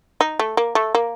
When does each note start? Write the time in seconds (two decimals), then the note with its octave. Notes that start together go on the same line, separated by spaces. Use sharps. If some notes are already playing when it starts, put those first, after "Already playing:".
0.21 D#4
0.39 A3
0.57 A#3
0.75 A3
0.95 A#3